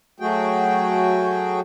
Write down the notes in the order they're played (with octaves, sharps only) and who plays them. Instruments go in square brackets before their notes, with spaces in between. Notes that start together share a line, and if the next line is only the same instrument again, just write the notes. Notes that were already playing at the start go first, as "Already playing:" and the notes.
[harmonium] F#3 A3 F#4 G#4 G5